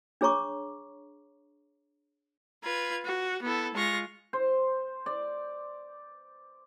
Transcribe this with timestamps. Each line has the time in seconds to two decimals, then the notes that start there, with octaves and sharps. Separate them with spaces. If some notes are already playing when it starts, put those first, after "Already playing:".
0.21 D4 G#4 C#5 A#5 C#6 D6
2.64 F4 B4 G#6
3.06 F#4
3.43 B3 E4 A4
3.75 G#3 F4 C#6 A#6
4.33 C5
5.06 D5